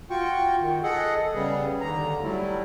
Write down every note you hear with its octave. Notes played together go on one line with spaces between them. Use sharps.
F4 F#4 G5 C#6
D#3
G#4 A4 D#5 F#5
C#3 G3 B3 G#4
D#2 D3 A#5
F#3 G3 A3 E4